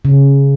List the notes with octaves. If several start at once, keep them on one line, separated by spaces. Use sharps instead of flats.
C#3